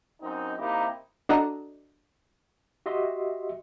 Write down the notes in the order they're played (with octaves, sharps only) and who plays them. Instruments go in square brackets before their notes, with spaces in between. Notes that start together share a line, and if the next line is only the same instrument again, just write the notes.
[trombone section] F#2 C4 D#4
C3 A#3 D#4 E4 G4
[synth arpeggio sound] D4 F#4 A4 D#5 A#5
[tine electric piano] F#4 G4 D#5 E5 C6